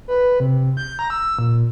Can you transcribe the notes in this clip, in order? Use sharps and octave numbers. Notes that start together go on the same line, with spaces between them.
B4
C3
G6
A#5
E6
A#2